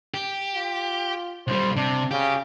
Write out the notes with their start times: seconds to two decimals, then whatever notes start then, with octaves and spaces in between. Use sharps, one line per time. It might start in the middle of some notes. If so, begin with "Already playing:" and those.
0.14 G4
0.55 F4
1.47 B1 G3 C5
1.77 C3 D4
2.11 C#3 G4